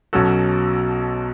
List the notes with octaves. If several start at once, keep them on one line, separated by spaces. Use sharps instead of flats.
B1 B2 F#3 C#4 F#4 A4